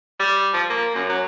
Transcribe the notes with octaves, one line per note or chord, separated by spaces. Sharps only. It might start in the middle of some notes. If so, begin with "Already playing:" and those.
G3
F3
A#3
F#2
F#3